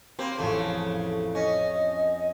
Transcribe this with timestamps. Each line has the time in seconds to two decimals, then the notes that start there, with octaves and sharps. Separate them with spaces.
0.19 A#3 C4 G4 B5
0.38 A1 F2 A2 C#3 A3
1.35 C#4 D#5 A#6 C#7